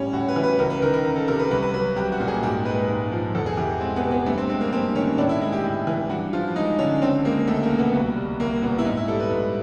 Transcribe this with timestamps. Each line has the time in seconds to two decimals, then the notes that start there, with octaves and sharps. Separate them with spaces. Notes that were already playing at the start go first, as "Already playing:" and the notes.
Already playing: A2 G3 C#4
0.13 A2 F#4
0.28 B4
0.36 E3
0.43 B4
0.59 C#2 A#4
0.70 B4
0.82 D#3 A#4
0.94 A#4
1.04 C#2
1.16 A4
1.28 C3 A#4
1.39 B4
1.51 C2 B4
1.62 B4
1.74 F#3 B4
1.96 C2 G4
2.12 F#4
2.20 A#2
2.28 G#4
2.43 G#2 G4
2.65 G#3 B4
2.88 G#2
3.12 F3
3.35 E2 A4
3.46 G#4
3.57 E3 G4
3.81 G#3 C4
3.96 B3
4.03 C3
4.11 B3
4.26 G2 A3
4.38 C4
4.49 G#3 C4
4.61 A#3
4.72 G2 C4
4.95 D#3 C#4
5.17 A2 D4
5.29 E4
5.41 G#3 E4
5.53 G4
5.63 A2
5.87 E3
6.09 G2 F#4
6.33 F3 F4
6.56 G#3 D#4
6.79 D3 C#4
7.02 C#2 C4
7.25 G#3 A#3
7.48 C#2 A3
7.63 A#3
7.70 B2
7.79 B3
7.94 C2
8.16 G3
8.40 C2 A#3
8.62 A#2 B3
8.78 E4
8.85 G#2 D#4
8.97 E4
9.08 G3 A4
9.20 B4
9.31 G#2